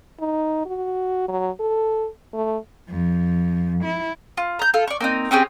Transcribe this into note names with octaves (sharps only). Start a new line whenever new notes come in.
D#4
F#4
F#3
A4
A3
F2
E4
F4
A#5 G6
F4 A4
D5 C#6
A#3 C4 D#4
C4 C#4 G4 G#4